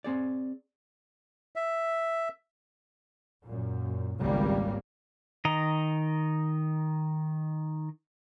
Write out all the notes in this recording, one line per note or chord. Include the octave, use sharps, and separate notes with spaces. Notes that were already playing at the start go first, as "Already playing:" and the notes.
C4 G#4 D5
E5
F#2 A#2
G#1 C#2 C#3 G3 A#3
D#3 D#5 A#5